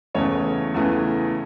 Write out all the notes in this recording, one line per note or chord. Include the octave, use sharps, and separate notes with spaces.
E2 C#3 E3 A3 C#5
E2 C#3 E3 A3